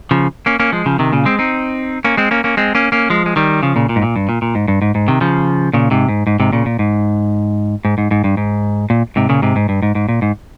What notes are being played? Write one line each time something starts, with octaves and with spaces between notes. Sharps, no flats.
C#3 F3
A#3 C#4
A#3 C#4
F3 G#3
C#3 F3
C3 D#3
A#2 C#3
G#3 C4
C4 D#4
A#3 C#4
G#3 C4
A#3 C#4
A#3 C#4
G#3 C4
A#3 C#4
A#3 C#4
F3 G#3
G#3
D#3 G3
C#3 F3
A#2 C#3
A#2
G#2
A#2
G2
A#2
A#2
G#2
G2
G#2
G#2
C3 D#3
C#3 F3
A#2 C#3
G#2 C3
G#2
G#2
G#2 C3
A#2 C#3
A#2
G#2
G#2
G#2
G#2
G2
G#2
A#2
G#2 C3
A#2 C#3
G#2 C3
G#2
G2
G#2
G#2
A#2
G#2